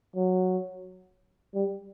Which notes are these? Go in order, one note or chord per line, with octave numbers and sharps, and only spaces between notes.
F#3
G3